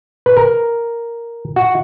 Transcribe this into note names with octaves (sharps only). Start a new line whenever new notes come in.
B4
A#4
F#4